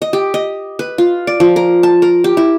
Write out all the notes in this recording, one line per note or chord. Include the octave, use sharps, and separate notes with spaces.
D#5
G4
D#5
B4
F4
D5
F3
A#4
A5
A#4
G4
E4